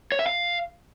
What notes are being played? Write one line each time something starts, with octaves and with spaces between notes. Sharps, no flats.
C#5
E5
F5